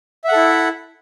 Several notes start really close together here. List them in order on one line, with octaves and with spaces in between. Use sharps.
E5 F#5 A4 E4